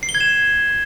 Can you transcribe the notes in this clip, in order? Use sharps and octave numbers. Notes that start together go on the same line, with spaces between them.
C7
G7
G#6
E7